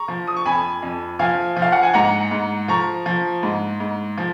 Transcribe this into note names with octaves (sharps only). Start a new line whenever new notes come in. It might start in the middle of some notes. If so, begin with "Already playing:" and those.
Already playing: A#5 C#6
F3
D#6
C#6
F2 G#5 B5
F2
F3 F5 G#5
F3
F5
F#5
G#5
G#2 F#5 A#5
G#2
F3 A#5 C#6
F3
G#2
G#2
F3